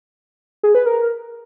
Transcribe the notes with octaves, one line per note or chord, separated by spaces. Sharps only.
G#4
B4
A#4